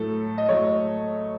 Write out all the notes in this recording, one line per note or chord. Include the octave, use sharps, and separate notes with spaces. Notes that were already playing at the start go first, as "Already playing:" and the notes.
Already playing: A2 F#3 A3 A4
D#5
A2 F#3 A3 C#5